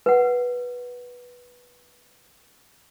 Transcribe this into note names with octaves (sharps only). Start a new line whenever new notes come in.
B4 F#5